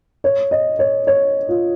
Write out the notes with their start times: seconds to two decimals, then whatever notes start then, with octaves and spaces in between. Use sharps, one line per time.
0.24 C#5
0.51 D#5
0.79 C#5
1.07 C#5
1.49 F4